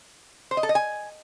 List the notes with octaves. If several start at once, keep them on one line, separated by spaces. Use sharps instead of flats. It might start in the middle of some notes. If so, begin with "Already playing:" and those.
C5
D#5
A4
D#5
G#5